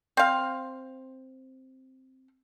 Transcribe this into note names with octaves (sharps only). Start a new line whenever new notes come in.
C4 F5